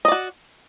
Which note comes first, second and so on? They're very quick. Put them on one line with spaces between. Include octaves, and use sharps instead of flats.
D#5 D5 F#4